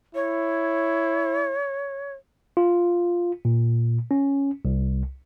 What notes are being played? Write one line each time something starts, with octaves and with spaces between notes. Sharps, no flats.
E4 C#5
F4
A#2
C#4
C2